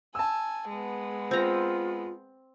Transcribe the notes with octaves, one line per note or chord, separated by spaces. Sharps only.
G#5 A5 E6
G#3 B3
C4 F4 A#5